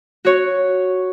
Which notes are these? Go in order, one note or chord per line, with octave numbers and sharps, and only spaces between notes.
F#4 C#5